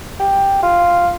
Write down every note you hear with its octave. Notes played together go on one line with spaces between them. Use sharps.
G4
F4